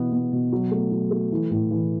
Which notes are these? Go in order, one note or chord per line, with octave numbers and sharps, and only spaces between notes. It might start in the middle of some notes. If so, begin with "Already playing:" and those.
Already playing: B2 E3 B3
B3
B2
F#3
A3
F#3
A3
E3
A2
E3